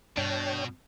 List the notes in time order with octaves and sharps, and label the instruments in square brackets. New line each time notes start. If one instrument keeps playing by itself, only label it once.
[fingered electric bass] G2 [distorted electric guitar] B2 [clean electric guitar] D4 [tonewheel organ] C#5 G5